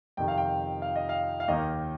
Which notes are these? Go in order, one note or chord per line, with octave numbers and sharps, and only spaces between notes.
F2 C3 D#3 G5
F5
G5
F5
D#5
F5
F5
D#2 D#3 A#3 D#4 D#5